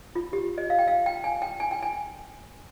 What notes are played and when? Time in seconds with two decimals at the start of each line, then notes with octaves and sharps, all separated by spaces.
0.15 F4
0.33 G4
0.58 D#5
0.70 F5
0.79 G5
0.88 F5
1.06 G5
1.24 G#5
1.42 G5
1.60 G#5
1.71 G5
1.83 G#5